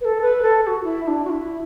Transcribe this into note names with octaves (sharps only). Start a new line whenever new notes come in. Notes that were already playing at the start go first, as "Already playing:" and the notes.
B4
A4
B4
A4
A4
F#4
E4
E4
D4
F#4
E4